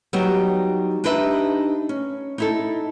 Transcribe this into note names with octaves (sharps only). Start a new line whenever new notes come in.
F#3 G3 B3 D#4 G4
D4 D#4 G4 B4 D#5 E5
C#4
D#4 E4 A4